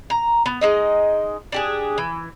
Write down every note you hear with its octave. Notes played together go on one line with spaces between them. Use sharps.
A#5
B3
G#3 D#4 D#5
D4 G4 G#4
E3